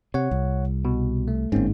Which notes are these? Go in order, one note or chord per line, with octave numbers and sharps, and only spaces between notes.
C3 C#5 F#5
C2
B2
A3
G1 G#2 A#3 C4 C#4